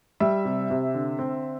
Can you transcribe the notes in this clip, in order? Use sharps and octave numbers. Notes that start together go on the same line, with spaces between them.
G3 E5
C3
C3
D3
C4